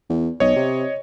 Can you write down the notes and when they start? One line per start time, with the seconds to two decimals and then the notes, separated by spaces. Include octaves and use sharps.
0.09 E2
0.40 B1 C#5 D#5
0.56 C3